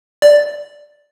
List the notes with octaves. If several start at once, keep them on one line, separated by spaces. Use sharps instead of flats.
D5